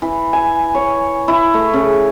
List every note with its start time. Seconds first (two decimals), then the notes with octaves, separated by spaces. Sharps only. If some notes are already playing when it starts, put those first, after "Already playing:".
0.02 E3
0.33 G#5
0.75 C#5
1.28 E4
1.54 A3
1.73 C#3